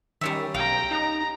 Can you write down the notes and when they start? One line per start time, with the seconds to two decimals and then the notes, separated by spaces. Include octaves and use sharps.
0.21 D#3 G3 C#4 E5
0.54 B1 F5 G5 A#5
0.91 D#4 A#5